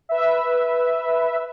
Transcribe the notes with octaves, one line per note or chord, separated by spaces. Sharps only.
B4 E5